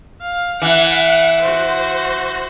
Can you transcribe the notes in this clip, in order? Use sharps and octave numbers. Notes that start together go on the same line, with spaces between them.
F5
E3 F#5
F#4 C5